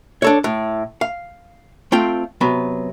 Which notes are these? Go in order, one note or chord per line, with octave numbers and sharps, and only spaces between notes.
D4 A4 C#5
A2
F5
A3 C4 F4 G5
C3 F#3 B3